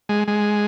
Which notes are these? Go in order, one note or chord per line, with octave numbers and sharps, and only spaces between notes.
G#3
G#3